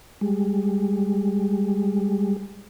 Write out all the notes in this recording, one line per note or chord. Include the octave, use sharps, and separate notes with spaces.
G3 G#3